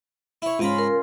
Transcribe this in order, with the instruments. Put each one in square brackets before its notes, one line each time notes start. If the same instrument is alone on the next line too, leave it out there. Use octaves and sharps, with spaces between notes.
[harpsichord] E4 C#5
[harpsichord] G#2 A#5 B5 [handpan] C#4 F4
[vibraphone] A#4